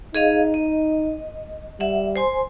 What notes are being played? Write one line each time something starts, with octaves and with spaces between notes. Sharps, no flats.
D#4 G#4 D#5 F5
D#5
G3 E5 F#5
C5 G#5 C6